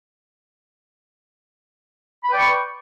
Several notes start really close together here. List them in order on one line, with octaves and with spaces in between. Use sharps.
B5 B4 G5 D5 C#6